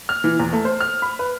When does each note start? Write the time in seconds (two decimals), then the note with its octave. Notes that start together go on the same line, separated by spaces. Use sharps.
0.09 F6
0.24 E3
0.40 E2
0.53 A3
0.65 C5
0.81 F6
1.02 B5
1.19 B4